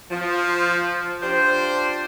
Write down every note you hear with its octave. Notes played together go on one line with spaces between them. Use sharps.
F3
D4 F4 G4 C5